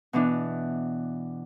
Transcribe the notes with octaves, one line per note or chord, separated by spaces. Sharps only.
B2 E3 D4